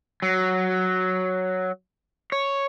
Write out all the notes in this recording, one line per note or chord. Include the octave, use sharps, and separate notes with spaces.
F#3
C#5